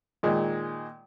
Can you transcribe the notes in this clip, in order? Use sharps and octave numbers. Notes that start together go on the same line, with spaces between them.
A#2 D#3 G#3